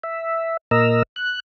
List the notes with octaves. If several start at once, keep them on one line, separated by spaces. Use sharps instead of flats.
E5
A#2 A#4 D#5 A#5 E6
F#6